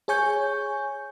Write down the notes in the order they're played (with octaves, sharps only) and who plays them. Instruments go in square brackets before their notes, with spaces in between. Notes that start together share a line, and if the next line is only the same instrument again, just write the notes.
[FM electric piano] G#4 C#5 G#5 C#6 G6